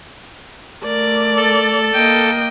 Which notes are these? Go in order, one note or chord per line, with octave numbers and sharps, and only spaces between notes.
A3 A#4 D5
A4
A#3 D#5 G5